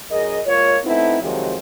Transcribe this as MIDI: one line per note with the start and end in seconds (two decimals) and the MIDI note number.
0.11 0.39 42
0.11 0.39 68
0.11 0.39 70
0.11 0.39 75
0.46 0.77 56
0.46 0.77 58
0.46 0.77 65
0.46 0.77 73
0.84 1.16 57
0.84 1.16 59
0.84 1.16 60
0.84 1.16 63
0.84 1.16 64
1.20 1.55 41
1.20 1.55 48
1.20 1.55 51
1.20 1.55 53
1.20 1.55 54
1.20 1.55 56